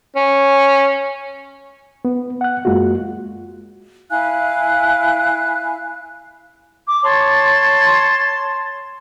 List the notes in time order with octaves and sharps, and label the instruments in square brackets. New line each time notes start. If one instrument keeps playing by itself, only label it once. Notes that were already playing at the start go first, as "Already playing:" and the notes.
[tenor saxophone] C#4
[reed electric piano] B3
F#5 F#6
F#2 G#3 A#3 F4 F#4
[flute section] E4 F5 G#5 F#6
D6
C#5 A5 C6